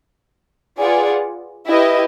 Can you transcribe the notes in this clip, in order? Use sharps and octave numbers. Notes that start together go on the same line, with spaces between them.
F4 G#4 B4 D5 F#5
E4 G4 B4 D#5